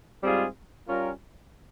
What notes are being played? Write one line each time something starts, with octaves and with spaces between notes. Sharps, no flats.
G#2 G3 C4 F4 G#4
G3 C#4 F4 A#4